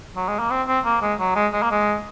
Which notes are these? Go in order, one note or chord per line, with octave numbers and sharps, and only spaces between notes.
F#3
G#3
A#3
C4
C4
A#3
G#3
F#3
G#3
G#3
A#3
G#3